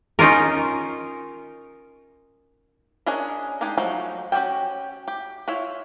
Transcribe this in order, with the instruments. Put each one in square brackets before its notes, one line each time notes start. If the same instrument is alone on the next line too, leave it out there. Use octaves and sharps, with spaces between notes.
[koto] C#4 D#4 F4 A#4
[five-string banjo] C#4 D4 G#4 A#4 D#5
G#3 D4 D#4 G4 G#4
F3 F#3 A3 D#4
C#4 F#4 G4 A4 G5
G4
E4 F4 C#5 E5